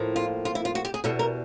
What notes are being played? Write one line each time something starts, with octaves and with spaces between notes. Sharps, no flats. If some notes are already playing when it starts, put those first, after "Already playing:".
Already playing: A2 F3 A#3
F4
F4
E4
F4
F#4
G4
G#4
E2 B2 G3 A4
A#4